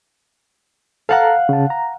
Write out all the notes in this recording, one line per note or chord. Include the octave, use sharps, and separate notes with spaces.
A4 F5 F#5 A5 A#5 F#6
C#3 A5
A#5